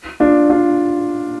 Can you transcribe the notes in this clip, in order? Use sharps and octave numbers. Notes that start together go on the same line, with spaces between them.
D4 F4
D4 F4